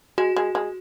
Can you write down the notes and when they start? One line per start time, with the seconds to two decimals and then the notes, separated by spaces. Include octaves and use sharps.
0.18 G#3 F#4
0.37 G#3
0.55 G#3